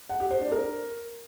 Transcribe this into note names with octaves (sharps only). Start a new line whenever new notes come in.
F#5
G4
C5
D4
A#4